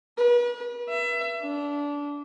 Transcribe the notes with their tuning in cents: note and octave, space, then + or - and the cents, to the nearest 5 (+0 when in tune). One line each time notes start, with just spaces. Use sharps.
B4 -40
E5 +25
D4 -20